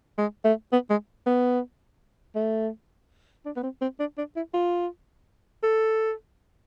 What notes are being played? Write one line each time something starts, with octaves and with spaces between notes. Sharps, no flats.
G#3
A3
B3
G#3
B3
A3
D4
B3
C4
C4
D4
D4
E4
F4
A4